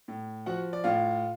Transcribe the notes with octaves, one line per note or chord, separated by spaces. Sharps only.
A2
F3 F#4 F#5
D5
A2 F4 F5